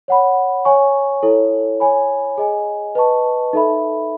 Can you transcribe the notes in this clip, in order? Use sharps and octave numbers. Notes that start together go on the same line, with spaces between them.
C#5 F#5 B5
C#5 G#5 C#6
E4 A4 C#5
C#5 G#5 B5
G#4 D#5 G#5
B4 D#5 A5 C#6
D#4 A4 E5 B5